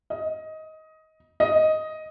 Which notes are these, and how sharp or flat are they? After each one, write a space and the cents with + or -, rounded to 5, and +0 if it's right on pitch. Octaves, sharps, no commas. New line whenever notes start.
D#5 +15
D#5 +5